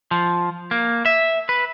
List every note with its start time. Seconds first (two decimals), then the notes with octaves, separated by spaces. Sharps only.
0.11 F3
0.71 A#3
1.06 E5
1.49 B4